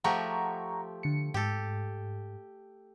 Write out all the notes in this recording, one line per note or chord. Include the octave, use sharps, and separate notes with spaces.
F3 A3 G4 F#5 A#5 C#6
D3 C#7
G#2 G4 A4